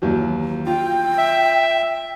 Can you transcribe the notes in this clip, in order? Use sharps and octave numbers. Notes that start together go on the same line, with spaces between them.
D#2 E3 F#3
F4 G5
E5